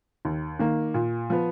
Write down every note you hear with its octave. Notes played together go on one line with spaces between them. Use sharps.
D#2
D#3 A#3
A#2
F3 B3